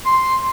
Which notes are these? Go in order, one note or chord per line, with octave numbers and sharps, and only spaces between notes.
C6